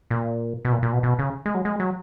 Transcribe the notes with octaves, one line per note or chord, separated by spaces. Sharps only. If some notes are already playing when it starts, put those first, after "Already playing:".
A#2
B2
A#2
A#2
B2
B2
C#3
G#3
F#3
G#3
F#3